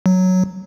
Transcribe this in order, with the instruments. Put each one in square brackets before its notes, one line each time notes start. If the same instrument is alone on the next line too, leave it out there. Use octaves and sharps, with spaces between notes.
[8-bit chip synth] F#3